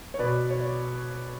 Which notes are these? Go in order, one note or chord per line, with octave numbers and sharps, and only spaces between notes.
C#5
B2 B4 D5
C#5
D5